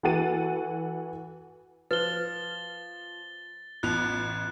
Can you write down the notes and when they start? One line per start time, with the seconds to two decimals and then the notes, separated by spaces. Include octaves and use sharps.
0.03 E3 F#4 A4 F#5 A6 D#7
1.91 F3 B4 C5 A6 G7
3.83 A1 B3 F4 A5 B5 F#6 F7